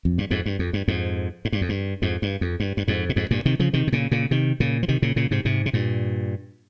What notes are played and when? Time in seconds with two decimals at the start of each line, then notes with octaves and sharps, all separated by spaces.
0.05 F2
0.18 G2
0.31 F2 G#2
0.46 G2
0.59 F2
0.73 G2
0.88 F2 G#2
1.45 G#2
1.52 G2
1.61 F2
1.69 G2
2.02 F2 G#2
2.22 G2
2.41 F2
2.60 G2
2.77 G2
2.88 F2 G#2
3.09 A#2
3.16 F2 G#2
3.31 G2 A#2
3.45 C3 D#3
3.60 C#3 F3
3.73 C3 D#3
3.87 C3
3.92 A#2 C#3
4.11 A#2 C#3
4.31 C3 D#3
4.60 A#2 C#3
4.83 F3
4.88 C3 D#3
5.02 A#2 C#3
5.16 A#2 C#3
5.31 G#2 C3
5.45 G#2 C3
5.66 C3
5.73 G2 A#2